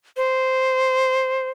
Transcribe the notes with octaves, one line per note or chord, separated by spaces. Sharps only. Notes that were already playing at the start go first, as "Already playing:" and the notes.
C5